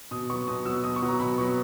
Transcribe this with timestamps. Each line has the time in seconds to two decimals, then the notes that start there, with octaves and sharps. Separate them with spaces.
0.11 B2 D#6
0.29 F#3 B3 C#6
0.48 B2 D#6
0.65 F#3 B3 E6
0.84 B2 D#6
0.96 C#6
1.02 F#3 B3
1.08 A#5
1.20 B2 B5
1.38 F#3 B3 C#6